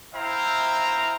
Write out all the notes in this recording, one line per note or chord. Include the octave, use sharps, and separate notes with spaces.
E4 C5 E5 F5 G5 A#5